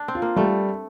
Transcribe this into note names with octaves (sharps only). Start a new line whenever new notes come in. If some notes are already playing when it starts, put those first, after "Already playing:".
Already playing: D4
C4
F4
A#3
G3 A3